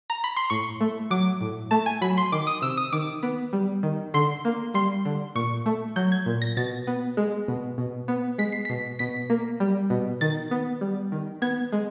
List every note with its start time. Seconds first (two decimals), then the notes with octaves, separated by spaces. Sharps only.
0.10 A#5
0.24 B5
0.36 C6
0.50 A2 C#6
0.81 A3
1.11 F#3 D6
1.41 A2
1.71 A3 A5
1.86 G#5
2.01 F#3 B5
2.17 C6
2.32 D#3 D6
2.47 D#6
2.62 C3 E6
2.77 D#6
2.92 D#3 D6
3.23 B3
3.53 G3
3.83 D#3
4.14 D3 C6
4.45 A#3
4.74 G3 C6
5.05 D3
5.35 A#2 C#6
5.66 A3
5.96 F#3 G6
6.12 G#6
6.26 A#2
6.42 A#6
6.57 B2 A6
6.87 B3
7.17 G#3
7.48 B2
7.78 B2
8.08 B3
8.38 G#3 B6
8.52 C7
8.65 B2 B6
8.99 B2 B6
9.30 A#3
9.60 G3
9.90 B2
10.21 D#3 A6
10.51 B3
10.81 G3
11.12 D#3
11.42 B3 G#6
11.72 G#3